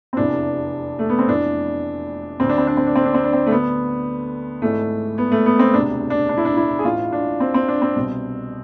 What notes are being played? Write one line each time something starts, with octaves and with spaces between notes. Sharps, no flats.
C4
F1 E2 C3 E3 D4
A3
B3
C4
F1 F2 E3 D4
D2 D3 C4
D4
C4
D4
C4
D4
C4
D4
C4
D4
C4
A3
D2 D3 B3
G#1 G#2 E3 A3
B3
A3
B3
C4
E1 D2 C3 D4
D4
D4
E4
D4
E4
G#4
A1 A2 E3 F4
D4
C4
C4
D4
C4
C2 B2